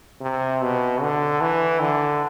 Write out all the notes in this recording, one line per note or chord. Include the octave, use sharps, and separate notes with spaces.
C3
B2
D3
E3
D3